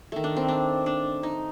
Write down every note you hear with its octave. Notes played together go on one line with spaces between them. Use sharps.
D#3 A3
D4
C4
D4
D4
D#4